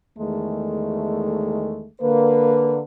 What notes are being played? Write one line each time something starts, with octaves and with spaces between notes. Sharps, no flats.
E2 D#3 G#3 A3
D3 A#3 B4